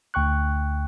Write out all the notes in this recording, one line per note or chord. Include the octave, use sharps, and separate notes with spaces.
D2 G5 C#6 F#6